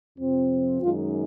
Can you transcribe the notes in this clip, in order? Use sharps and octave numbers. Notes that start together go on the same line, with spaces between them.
F2 C3 F3 C4
F#2 D#3 G#3 D#4 F4